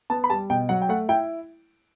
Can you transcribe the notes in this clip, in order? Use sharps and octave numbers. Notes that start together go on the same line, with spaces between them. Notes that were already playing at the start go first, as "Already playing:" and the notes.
B3 A5
B5
G3 A5
B2 G5
F#3 F#5
G5
A3 F#5
E4 G5